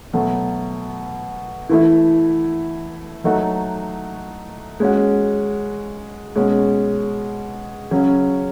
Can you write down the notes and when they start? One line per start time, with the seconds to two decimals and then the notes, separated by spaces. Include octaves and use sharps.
0.13 B2 F#3 A3
1.70 E3 A3 E4
3.24 F#3 A3 D#4 F#4
4.80 G#3 C#4 F#4
6.36 B2 G#3 C#4
7.91 C#3 F#3 C#4